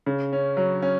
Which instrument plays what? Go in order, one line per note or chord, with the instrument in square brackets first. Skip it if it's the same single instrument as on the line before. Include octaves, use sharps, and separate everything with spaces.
[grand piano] C#3
C#4
F#3
C#4